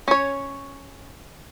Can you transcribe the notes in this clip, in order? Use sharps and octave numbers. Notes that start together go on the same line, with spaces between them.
C#4 C#5